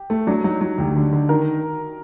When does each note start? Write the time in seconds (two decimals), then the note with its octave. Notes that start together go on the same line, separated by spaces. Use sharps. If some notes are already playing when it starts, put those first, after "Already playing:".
Already playing: G4
0.10 A3
0.27 F#3 D4
0.44 F#3 D#4
0.61 F#3 F#4
0.78 D2 G4
0.96 D3
1.13 D3
1.29 D#3 A#4